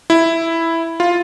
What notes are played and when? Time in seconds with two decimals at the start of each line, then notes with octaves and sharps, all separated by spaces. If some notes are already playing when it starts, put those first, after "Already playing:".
0.10 E4
1.00 F4